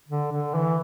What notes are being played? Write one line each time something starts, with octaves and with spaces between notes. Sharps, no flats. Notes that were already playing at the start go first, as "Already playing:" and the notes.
D3
D3
E3